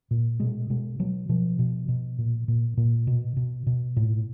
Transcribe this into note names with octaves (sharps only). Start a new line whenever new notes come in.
A#2
B2 G#3
B2 G#3
B2 F#3
B2 F3
B2
B2
A#2
A#2
A#2
B2
B2
B2
A2